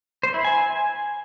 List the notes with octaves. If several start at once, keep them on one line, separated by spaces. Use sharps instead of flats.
C5
E4
G#5